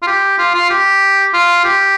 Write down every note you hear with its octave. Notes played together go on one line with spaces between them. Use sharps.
F4
G4
F4
F4
G4
F4
G4